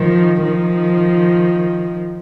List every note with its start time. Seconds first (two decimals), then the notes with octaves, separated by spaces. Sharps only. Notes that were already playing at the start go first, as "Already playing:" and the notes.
Already playing: D#3 F3
0.43 D#3 F3